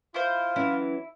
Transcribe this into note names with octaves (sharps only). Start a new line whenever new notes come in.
E4 F4 C5
E3 F#3 C#4 E4